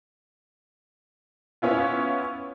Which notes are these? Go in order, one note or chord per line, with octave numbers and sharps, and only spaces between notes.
B3 C#4 E4 F4